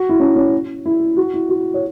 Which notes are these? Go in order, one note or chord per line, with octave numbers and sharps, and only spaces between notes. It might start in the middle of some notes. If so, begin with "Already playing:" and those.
Already playing: F#4
E4
C#4
C#4
E4
F#4
E4
F#4
C#5